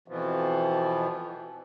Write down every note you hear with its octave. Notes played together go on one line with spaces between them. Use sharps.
F2 B2 E3 F3